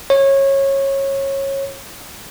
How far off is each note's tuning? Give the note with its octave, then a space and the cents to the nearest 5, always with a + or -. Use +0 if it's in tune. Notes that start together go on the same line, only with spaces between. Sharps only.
C#5 -20